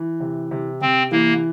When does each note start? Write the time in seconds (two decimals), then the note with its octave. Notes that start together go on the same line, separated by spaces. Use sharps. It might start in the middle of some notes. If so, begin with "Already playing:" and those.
Already playing: E3
0.20 C3
0.51 C3
0.81 C3 C4
1.11 E3 A#3